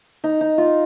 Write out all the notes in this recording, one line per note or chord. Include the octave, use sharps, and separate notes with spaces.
D#4
D#4
F4